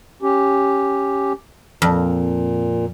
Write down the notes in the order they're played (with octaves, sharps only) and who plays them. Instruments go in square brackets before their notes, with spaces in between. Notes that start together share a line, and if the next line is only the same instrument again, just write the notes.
[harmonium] C#4 G4
[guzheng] F2 [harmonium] A#2